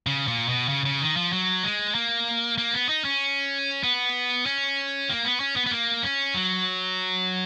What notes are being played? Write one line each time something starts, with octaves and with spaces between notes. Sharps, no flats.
C#3
A#2
B2
C#3
C#3
D#3
F3
F#3
G#3
A#3
A#3
B3
D#4
C#4
B3
C#4
A#3
B3
C#4
B3
B3
A#3
C#4
F#3